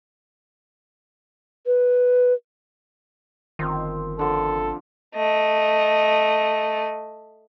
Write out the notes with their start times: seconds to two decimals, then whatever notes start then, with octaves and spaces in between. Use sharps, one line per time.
1.66 B4
3.59 G1 D#3 F3 C4
4.19 D3 F3 A4
5.15 A3 D#5